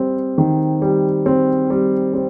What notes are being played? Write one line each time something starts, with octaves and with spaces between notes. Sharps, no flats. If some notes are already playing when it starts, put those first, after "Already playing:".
Already playing: G3 C4
D#3
G3
C4
G3
C4